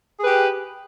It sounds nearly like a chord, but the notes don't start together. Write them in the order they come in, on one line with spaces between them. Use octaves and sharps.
G#4 B4 G4